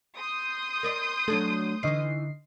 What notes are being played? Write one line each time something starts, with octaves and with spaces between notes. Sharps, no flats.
C6 D#6 G6
A#4 D5 D#5
F#3 A3 D4 A4
D3 E3 D#4 D#5 C7